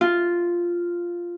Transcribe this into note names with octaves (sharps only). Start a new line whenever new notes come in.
F4